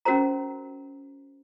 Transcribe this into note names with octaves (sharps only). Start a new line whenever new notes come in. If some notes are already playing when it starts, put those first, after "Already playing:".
C#4 F#4 A#4 C5 A#5